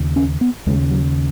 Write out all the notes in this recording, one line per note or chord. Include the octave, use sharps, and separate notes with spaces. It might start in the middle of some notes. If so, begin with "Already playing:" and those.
Already playing: D#2 C#3
C#4
B3
D#2 C#3 G#3
F#3